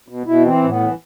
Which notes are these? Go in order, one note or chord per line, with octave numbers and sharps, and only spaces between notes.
B2
B2 E4
E3 C4
A2
B3
E3